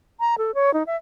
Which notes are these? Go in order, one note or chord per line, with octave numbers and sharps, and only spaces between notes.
A#5
A4
C#5
D#4
E5